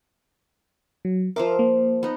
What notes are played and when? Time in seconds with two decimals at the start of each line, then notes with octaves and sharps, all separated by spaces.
1.05 F#3
1.36 F3 A#4 C5 E5 D6
1.59 A#3
2.03 B3 D#4